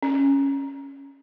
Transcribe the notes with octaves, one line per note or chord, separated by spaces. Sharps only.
C#4